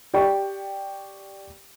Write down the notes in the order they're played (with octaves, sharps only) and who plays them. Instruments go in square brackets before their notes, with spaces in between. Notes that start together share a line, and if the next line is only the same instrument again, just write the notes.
[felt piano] G4 D5 G5 C#6